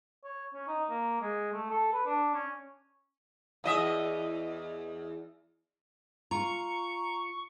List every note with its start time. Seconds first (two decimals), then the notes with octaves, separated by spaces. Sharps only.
0.24 C#5
0.54 C#4
0.67 D#4
0.90 A#3
1.21 G#3
1.53 A3
1.70 A4
1.93 B4
2.06 D4
2.34 C#4
3.64 E2 D#5 E5
6.31 F4 A#5 C#6